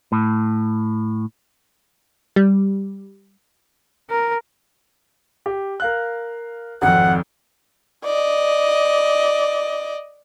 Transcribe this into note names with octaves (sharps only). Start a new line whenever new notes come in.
A2
G3
A#4
G4
A#4 F5 F#6
G#1 F2 F#5
D5 D#5